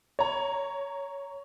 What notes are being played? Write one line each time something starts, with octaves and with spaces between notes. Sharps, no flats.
C#5 A#5